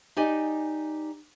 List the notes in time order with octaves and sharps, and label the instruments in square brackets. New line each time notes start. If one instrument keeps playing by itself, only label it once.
[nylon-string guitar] D#4 G4 D5 D#5 G#5